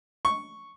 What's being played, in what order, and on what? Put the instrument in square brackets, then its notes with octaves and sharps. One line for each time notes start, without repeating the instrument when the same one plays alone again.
[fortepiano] C#6